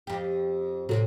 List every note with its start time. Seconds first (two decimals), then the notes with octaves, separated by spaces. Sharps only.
0.07 F2 G4
0.89 A2 C3 D#3 F#3 F#4 A4